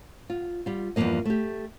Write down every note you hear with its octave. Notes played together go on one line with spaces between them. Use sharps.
F4
G3 F4
E2 G2 C3 F3 A#3 D#5
A3 G4